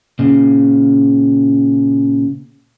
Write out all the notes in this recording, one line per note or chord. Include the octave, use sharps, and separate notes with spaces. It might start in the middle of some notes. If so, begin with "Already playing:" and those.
A#2 C#3